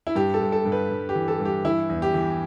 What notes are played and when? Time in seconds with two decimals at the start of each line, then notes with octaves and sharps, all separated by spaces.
0.07 E4
0.15 G2 G4
0.34 A4
0.40 G2
0.52 A4
0.65 G2
0.72 B4
0.90 G2
1.09 G4
1.15 E3
1.28 A4
1.40 G2
1.45 G4
1.65 E3 E4
1.89 E2
2.02 G4
2.14 E3